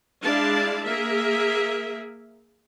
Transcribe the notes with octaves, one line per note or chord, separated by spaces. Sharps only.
G#3 D4 E4 D5 F5 A5
A#3 G#4 A#4 E5